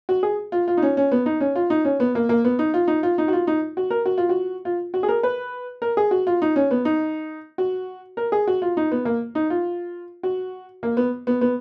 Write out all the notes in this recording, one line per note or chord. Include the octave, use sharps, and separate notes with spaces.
F#4
G#4
F4
F4
D#4
C#4
C#4
B3
D#4
C#4
F4
D#4
C#4
B3
A#3
A#3
B3
D#4
F4
D#4
F4
D#4
F#4
F4
D#4
F#4
A#4
F#4
F4
F#4
F4
F#4
G#4
A#4
B4
A#4
G#4
F#4
F4
D#4
C#4
B3
D#4
F#4
A#4
G#4
F#4
F4
D#4
B3
A#3
D#4
F4
F#4
A#3
B3
B3
B3